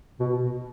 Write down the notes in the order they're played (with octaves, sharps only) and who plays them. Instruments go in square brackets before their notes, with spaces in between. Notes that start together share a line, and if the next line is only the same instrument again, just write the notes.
[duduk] B2